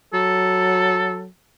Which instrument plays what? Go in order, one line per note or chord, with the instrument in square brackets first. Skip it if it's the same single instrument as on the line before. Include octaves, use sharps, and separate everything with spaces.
[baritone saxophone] F#3 [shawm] A4